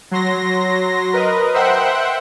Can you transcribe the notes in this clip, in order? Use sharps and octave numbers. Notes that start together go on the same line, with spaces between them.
F#3 C6 A#6
A#4 B4 D#5
C5 E5 F#5 G5 C6